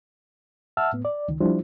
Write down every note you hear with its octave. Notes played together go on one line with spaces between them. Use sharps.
E5 F#5 A5 E6 F6
A2 B3
D5
C#2 D#3
F3 G3 D4 E4 F4 C5